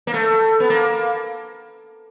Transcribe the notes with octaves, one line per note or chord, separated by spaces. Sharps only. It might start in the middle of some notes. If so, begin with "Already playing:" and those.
A#3
A3
B3
A#3